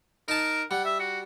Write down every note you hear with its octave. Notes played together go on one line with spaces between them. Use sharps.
D#4 A#4 A5
G3 F#5
E5
F#4